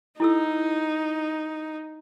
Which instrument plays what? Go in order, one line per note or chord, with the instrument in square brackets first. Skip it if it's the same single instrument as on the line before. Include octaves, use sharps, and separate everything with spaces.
[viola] D#4 [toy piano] E4 A4 E6